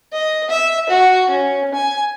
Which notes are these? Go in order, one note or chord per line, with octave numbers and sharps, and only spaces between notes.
D#5
E5
F#4
C#4
G#5